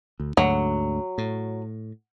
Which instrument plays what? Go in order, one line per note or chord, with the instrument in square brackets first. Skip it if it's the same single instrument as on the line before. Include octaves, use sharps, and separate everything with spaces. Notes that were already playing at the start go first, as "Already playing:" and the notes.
[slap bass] D2
[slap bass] D2 G#2 D3 [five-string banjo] F#3
[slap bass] A2